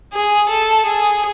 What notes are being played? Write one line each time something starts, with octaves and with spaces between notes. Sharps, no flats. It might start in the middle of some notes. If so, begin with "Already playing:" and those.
G#4
A4
G#4